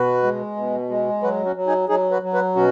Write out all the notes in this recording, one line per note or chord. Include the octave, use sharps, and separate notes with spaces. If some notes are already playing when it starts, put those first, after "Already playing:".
Already playing: B2 F#4 B4
G#3
B2
G#3
F#3 F#4 B4
C#4 F#4
F#3
D#4 G#4
F#3 D#4 G#4
F#4 B4
F#3
F#4 B4
B2 C#4 F#4